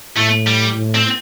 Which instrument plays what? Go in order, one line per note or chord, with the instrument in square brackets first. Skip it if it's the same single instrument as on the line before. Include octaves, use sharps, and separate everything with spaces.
[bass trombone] A2 [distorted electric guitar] A3
[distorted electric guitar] G3
[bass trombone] A2
[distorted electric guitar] C4